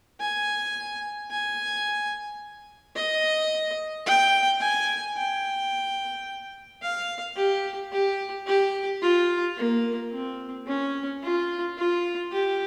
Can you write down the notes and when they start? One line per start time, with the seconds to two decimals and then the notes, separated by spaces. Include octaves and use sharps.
0.20 G#5
1.31 G#5
2.96 D#5
4.06 G5
4.61 G#5
5.17 G5
6.82 F5
7.36 G4
7.92 G4
8.47 G4
9.02 F4
9.57 A#3
10.12 C4
10.67 C#4
11.23 F4
11.78 F4
12.32 G4